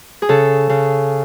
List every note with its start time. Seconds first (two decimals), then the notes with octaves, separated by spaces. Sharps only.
0.22 G#4
0.29 C#3 A4
0.69 C#3